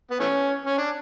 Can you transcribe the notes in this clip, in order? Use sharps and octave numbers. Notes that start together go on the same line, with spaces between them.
B3
E3 A3 C#4
C#4
D4